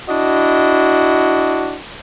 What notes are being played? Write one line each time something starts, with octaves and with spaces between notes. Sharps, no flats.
D4 E4 F#4 D#5